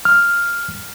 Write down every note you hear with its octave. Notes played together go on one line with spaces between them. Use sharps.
F6